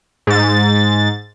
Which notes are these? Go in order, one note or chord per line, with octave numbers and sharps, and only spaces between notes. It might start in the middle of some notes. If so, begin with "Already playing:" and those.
G#2 A6